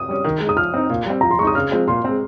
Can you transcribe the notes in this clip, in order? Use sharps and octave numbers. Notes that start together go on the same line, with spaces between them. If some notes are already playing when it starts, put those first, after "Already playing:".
Already playing: D#6
G3 C#4
D#3
G#3
D#4 D#6
F3 F6
C4 D#4
A#2
G3 C4
F3 A#5
C6
G#3 D#4 C#6 D#6
C#3 F6
F3 G#3 C4
A#2 C6
G#3 C4